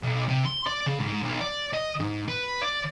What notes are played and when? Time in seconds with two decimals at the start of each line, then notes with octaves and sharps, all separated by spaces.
0.03 B1
0.29 C3
0.46 C6
0.67 D5
0.86 C#3
1.00 G#2
1.24 B1
1.41 D5
1.74 D#5
2.00 G#2
2.28 B4
2.62 D5